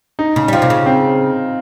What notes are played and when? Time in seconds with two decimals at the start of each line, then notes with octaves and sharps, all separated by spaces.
0.19 D#4
0.36 C#3
0.48 G3
0.53 F3 F4
0.62 C3
0.70 C#3
0.86 C4